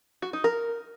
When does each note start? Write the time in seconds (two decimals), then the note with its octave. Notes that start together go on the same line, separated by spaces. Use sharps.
0.22 F#4
0.33 D#4
0.44 A#4